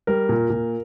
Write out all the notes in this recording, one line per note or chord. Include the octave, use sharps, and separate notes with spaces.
G3 A#4
A#2
A#2